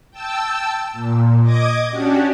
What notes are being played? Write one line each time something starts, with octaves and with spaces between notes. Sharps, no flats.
G5 A5 E6
A#2
D#5 D6 D#6 G#6
C#4 D4 F#4 G4